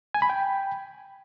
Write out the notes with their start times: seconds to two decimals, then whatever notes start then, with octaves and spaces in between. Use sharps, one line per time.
0.14 G#5
0.22 B5
0.30 G5